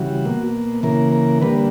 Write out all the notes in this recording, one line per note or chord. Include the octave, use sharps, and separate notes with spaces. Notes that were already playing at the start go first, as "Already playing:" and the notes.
Already playing: C#3 E3 G3 F#4
B2 A#3
C#3 E3 A#3 A#4
A#4
D3 G3 A#3 B4